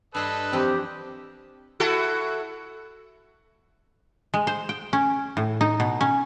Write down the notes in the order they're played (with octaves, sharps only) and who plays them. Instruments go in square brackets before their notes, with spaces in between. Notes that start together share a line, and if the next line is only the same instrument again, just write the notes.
[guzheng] G2 D4 C6 [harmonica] A4 B4 D#5
[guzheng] F2 E3 [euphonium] C4 [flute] G4
[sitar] E4 F#4 A4
[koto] G#3
C5
G5
C#4
A2
D#4
B2
C#4